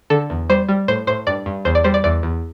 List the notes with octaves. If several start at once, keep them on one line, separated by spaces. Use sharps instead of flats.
D3 A4
E2
G3 C5
G3
A2 C5
A2 C5
G2 D5
G2
E2 C5
D5
G3 C5
D5
E2 D5
E2